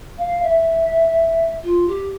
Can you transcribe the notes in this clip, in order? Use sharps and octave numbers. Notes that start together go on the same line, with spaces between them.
F5
E5
F4
G4